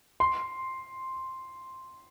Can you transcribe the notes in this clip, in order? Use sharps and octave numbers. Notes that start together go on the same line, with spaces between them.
C6